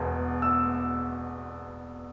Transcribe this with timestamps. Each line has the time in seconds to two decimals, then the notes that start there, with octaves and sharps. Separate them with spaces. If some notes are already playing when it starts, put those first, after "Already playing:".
Already playing: E1 E2 B2 G#3
0.42 E6